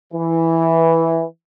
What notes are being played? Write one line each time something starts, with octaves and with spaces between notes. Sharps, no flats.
E3